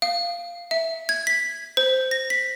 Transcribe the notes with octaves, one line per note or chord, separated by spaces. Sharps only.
F5
E5
G#6
B6
C5
A#6
B6